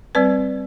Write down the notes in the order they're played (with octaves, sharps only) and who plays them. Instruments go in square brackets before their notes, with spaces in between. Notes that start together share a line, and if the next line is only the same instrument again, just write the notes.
[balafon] G3 C4 B4 D5